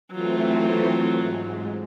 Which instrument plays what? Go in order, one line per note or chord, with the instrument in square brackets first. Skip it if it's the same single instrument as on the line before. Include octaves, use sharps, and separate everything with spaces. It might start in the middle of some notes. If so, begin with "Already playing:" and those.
[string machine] E3 A3 C4 [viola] F#3 F4
[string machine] G#2